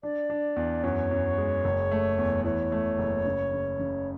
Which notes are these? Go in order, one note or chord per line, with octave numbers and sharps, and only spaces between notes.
D4 D5
D4
E2
F#2 C#5
F#2
G#3
F#1
A3
E2
E3 C#5
A3
F#1
C#3
C#3
C#3